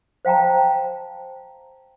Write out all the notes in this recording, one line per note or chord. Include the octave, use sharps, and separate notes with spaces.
C5 F5 G5 A5 A#5